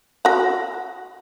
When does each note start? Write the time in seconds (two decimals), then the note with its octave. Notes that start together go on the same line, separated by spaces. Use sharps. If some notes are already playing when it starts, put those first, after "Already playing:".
0.25 F#4 F#5